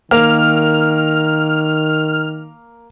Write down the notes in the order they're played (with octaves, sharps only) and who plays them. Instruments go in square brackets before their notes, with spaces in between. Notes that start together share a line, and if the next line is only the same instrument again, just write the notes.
[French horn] D#3 [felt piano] A#3 [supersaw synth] F6